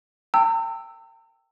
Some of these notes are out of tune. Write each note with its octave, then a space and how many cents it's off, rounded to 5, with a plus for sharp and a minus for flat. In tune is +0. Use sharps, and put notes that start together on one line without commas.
G5 +0 A#5 -45 E6 +0